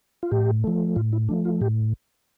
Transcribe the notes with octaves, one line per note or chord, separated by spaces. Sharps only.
F4
A2 G4
F3 A3
A2 F4
E4
F3 A3 D4
F4
A2 G4